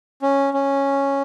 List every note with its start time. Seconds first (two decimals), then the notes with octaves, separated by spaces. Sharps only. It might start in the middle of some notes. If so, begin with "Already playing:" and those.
0.22 C#4
0.54 C#4